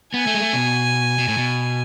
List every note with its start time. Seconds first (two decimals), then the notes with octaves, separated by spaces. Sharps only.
0.14 B3 G#5
0.27 A3
0.34 G#3
0.40 A3
0.53 B2
1.19 B2
1.28 A2
1.38 B2